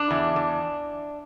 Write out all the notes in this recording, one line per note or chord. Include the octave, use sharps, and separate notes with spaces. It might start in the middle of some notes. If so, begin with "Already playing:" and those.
Already playing: D4
E2
E2